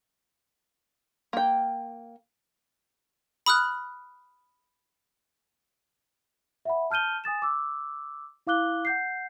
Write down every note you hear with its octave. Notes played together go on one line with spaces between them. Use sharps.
A#3 G5
B5 D#6 F6 F#6
E5 F#5 B5
A5 F6 G6 D#7 G7
G#5 D#6 A6 E7
D6 E6
E4 F5 D6 F#6 G7
F#5 G6 C7